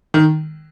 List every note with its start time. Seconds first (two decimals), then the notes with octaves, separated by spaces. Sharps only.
0.14 D#3